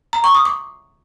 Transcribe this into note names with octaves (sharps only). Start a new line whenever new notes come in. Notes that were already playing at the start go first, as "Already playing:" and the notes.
A#5
C#6
D#6
D6